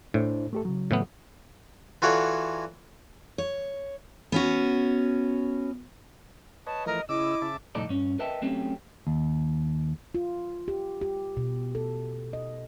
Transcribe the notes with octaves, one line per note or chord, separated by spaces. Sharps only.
A2 D4 E4 C5
A3 G4 A4
C#3 F#3
A2 E3 B3
E3 F4 F#4 A4 C#5 D5
C#5
B3 C#4 F#4
B4 C#5 D#5 A5
E3 F3 A3 A#4 D#5
C#3 E4 D#5 D6 E6
C#3 E5 A5
C2 F2 A2 D#4 A4 D5
G2 C#4
A#4 B4 D#5 E5 G5 A5
F#3 A3 C4 C#4 G4
D#2
F4
G4
G4
B2
A4
D#5